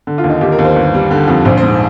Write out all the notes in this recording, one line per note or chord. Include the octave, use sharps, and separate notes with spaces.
D3
F4
D#2
D#4
D#2 G4
A#4
D#2
C5
G1
G3
D3
F2
A#1 C5
C5
G#2